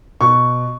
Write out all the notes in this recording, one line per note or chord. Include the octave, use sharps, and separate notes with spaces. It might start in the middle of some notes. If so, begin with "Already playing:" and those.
B2 C#6